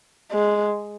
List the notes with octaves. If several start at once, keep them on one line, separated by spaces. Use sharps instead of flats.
G#3